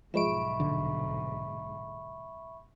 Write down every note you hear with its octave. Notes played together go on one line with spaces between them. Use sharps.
B1 G#2 F3 G#3 E5 B5 C#6 D7
A#1 D3